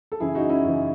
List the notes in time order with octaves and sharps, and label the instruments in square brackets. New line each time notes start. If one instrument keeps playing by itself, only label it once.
[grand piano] A4
F#2 C#3 E3 E4 G#4
D#4 F#4
C#4 E4
F#2 C#3 E3